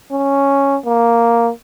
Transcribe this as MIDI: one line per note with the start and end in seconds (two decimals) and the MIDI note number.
0.12 0.77 61
0.86 1.51 58